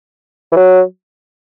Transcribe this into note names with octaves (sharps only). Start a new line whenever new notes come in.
E3
F#3